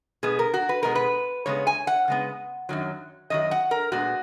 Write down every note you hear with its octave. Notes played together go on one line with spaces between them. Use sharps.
B2 G#3 B3 G#4
A#4
F#4
B4
B2 G#3 B3 A#4
B4
C#3 G#3 B3 C#5
G#5
F#5
C#3 G#3 B3
F#2 D#3 F#3
F#2 D#3 F#3 D#5
F#5
A#4
A#2 G#3 B3 F#4